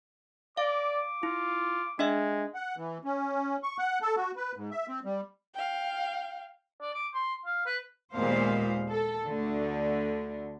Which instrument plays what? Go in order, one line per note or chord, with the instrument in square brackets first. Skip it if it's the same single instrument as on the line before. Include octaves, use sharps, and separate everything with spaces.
[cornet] D5 [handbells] F5 [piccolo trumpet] D6
[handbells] E4 [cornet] F4
[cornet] G#3 [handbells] D4 D#5 E5
[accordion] F#5
E3
C#4
C#6
F#5
A4
F#4
B4
G#2
E5
C4
G3
[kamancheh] F5 G5
[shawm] D5
D6
C6
F5
B4
[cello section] D#2 A#2 G#3 B3 C5 F5
A4
D2 D3 A3